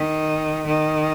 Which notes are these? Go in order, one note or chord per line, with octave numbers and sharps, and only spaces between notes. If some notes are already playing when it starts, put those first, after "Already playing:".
Already playing: D#3
D#3